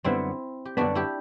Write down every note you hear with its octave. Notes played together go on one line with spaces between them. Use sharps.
F#2 D3 G3 B3 C4 E4
G4
F#2 D3 G3 B3 D4 F#4
E4 G4